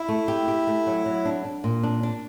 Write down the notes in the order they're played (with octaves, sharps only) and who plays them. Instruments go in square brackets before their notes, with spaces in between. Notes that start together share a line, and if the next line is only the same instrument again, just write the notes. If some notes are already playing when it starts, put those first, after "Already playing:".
Already playing: [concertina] E4
[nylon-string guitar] A3
G4
G4
A3
F#3
F#3
D4
D4
A#2
D4
D4